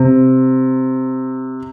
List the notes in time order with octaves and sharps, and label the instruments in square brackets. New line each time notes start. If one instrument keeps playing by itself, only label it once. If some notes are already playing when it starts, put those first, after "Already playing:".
Already playing: [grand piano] C3